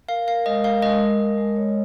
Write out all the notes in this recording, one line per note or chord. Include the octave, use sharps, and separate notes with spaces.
A#4 F5
A#4 F5
G#3 D#5
A#4 F5
G#3 D#5
G#3
G#3
G#3
C#5